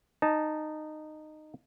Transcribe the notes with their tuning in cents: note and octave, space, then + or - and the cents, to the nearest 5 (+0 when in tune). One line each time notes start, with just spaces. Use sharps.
D#4 -15 A5 +0